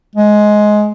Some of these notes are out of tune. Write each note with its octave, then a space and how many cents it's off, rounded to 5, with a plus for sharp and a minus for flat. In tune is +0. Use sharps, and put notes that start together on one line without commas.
G#3 +15